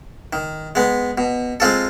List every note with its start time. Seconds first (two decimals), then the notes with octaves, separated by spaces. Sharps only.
0.33 D#3
0.75 G#3 B3
1.18 B2
1.60 G#3 C4 F4 A4